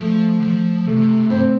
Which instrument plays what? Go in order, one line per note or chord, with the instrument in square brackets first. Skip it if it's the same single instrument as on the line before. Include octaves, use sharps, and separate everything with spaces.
[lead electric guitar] F3 [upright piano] A3
[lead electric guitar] D3
F3
[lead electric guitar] C3 [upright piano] A3
[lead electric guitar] G2 [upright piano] C4